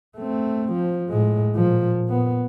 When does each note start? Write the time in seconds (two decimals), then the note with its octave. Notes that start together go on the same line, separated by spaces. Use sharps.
0.17 A3 C4
0.73 F3
1.09 A2 G#3
1.56 A#2 F3
2.08 A#2 B3